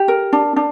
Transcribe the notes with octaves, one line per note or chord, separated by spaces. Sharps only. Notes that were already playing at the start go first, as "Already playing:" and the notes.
Already playing: G4
A#4
D4
D4